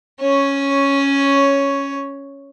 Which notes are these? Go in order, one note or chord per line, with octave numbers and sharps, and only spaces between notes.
C#4 C#5